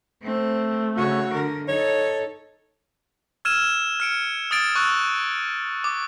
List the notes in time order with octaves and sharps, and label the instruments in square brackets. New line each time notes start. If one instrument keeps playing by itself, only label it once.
[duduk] A3 [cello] C4
[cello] C#3 C#5 [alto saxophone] F#4
[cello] D3 A#4
[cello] D#4 A4 [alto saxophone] C#5
[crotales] E6 F6 G#6 D#7 E7
F6 C#7 D7
D#6 G#6 A6 D7
C#6 E6 F#6
D6